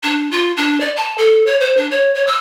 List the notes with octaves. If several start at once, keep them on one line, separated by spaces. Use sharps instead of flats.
D4
F4
D4
D5
A5
A4
C#5
C5
D4
C#5
C#5
E6